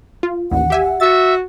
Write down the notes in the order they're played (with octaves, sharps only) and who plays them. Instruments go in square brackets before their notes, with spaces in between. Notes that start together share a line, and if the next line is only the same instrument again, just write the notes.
[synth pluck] F4
[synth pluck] A1 D#2 [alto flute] F#5
[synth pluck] G4 E5 G#5
[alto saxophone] F#4 [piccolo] E5 [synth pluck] A6 C#7